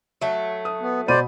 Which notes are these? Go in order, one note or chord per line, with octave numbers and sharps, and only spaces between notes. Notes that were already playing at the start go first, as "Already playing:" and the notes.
F#3 A3 E5 A5
D#6
B3
B2 C5 D5 B5 D#7